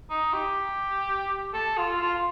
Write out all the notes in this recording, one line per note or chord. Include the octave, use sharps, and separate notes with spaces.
D#4
G4
A4
F4
F4